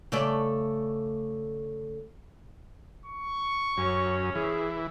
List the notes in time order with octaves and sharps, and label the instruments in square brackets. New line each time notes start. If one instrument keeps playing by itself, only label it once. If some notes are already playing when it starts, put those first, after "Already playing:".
[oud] C#3 A3 D5
[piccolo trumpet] C#6
[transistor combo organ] F#2 [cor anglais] C#4
[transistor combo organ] E3 [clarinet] G#4